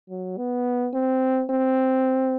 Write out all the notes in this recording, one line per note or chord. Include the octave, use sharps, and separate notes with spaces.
F#3
B3
C4
C4